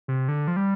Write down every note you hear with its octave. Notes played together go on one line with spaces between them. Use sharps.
C3
D3
F3
G3